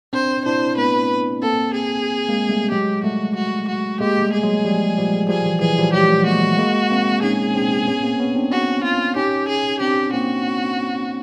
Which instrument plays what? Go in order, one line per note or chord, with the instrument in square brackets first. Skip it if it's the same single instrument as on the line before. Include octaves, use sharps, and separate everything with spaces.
[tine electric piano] C4 D4 [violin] C5
[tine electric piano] D4 E4 [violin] C5
[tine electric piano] A3 B3 [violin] B4
[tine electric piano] A#3 C4 [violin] A4
[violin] G#4
[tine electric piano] G#3 A#3
G3 A3
[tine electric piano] F#3 G#3 [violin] G4
[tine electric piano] G3 A3 [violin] F#4
[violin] F#4
F#4
[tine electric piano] G#3 A#3 [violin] G4
[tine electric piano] G3 A3
[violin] G#4
[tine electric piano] F#3 G#3
F3 G3
F3 G3
[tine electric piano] F3 G3 [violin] G#4
[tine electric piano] E3
[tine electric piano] E3 F#3 [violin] G#4
[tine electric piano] F3 G3
[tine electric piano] F#3 G#3 [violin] G4
[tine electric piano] G3 A3
[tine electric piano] G#3 A#3 [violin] F#4
[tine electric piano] G3 A3
G#3 A#3
A#3 C4
[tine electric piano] C#4 D#4 [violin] G#4
[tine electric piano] C4 D4
B3 C#4
A#3 C4
B3 C#4
C4 D4
[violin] F#4
F4
[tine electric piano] C#4 D#4 [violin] G4
[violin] G#4
[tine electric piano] C4 D4 [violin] G4
[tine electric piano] A#3 C4 [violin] F#4